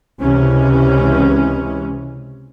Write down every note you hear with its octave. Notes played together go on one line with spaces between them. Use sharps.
C#2 C3 E3 G#3 C#4